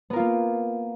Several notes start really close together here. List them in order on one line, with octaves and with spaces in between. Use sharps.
B3 A#4 F4 A#3